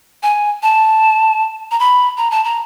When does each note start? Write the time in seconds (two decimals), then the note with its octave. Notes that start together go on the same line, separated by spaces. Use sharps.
0.23 G#5
0.62 A5
1.71 A#5
1.80 B5
2.17 A#5
2.31 A5
2.44 A#5